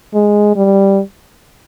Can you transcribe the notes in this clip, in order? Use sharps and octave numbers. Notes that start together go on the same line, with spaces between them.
G#3
G3